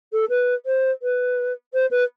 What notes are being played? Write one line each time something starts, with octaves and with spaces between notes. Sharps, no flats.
A4
B4
C5
B4
C5
B4